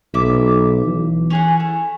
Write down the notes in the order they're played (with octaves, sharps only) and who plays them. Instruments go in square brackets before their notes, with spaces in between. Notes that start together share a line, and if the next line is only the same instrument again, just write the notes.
[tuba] B1 [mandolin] E5 D6
[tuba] E3
[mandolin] C#4 G#4 F#5
A3